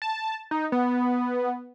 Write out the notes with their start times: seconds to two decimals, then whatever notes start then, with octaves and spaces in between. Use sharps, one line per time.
0.02 A5
0.51 D#4
0.72 B3